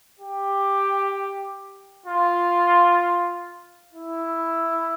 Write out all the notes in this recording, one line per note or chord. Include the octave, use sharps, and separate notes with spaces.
G4
F4
E4